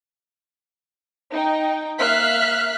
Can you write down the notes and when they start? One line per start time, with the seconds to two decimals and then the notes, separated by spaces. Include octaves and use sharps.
1.33 D#4 G5
1.99 A#3 E5 F5 F6 F#6 B6